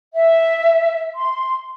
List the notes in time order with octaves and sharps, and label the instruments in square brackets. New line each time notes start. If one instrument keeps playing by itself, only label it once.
[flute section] E5
C6